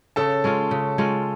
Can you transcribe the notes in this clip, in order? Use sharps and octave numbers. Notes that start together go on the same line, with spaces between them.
C#3 A4 A5
G#3 C#4 F4
C#3
G#3 C#4 F4